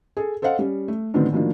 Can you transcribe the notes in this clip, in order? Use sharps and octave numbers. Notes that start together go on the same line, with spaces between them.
G#4 A4
A4 C5 D#5 F5 F#5
G3 C#4
A3
A2 D3 D#3 F#3 B3 C4
A2 D#3 F3 F#3 A#3 D4